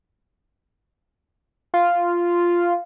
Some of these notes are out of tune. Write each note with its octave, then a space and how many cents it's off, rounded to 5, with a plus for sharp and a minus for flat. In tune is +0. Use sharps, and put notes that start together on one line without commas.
F4 -5